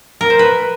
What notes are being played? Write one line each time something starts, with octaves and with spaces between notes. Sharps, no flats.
A#4
C5
B4